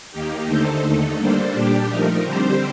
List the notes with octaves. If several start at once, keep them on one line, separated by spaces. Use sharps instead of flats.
D#2 D#3 A#3 D#4 G4
D3 A3 D#4 A4 C5
D#2 D3 A3 D#4 A4
G3 A#3 D4 A4 C5
A#2 G3 D4 G4
F3 A3 D#4 A#4
D3 G3 C4 G4 C5